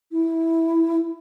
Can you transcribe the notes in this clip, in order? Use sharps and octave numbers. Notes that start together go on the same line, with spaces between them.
E4